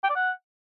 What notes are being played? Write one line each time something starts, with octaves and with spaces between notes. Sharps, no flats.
G5
D5
F#5